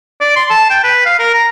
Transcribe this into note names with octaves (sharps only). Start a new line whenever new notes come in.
D5
C6
A5
G5
B4
F5
A#4
A#5